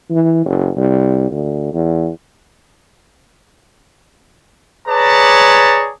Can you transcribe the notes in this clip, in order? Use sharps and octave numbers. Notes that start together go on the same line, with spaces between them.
E3
F#1
C2
D2
E2
G#4 B4 C#5 D5 A5 A#5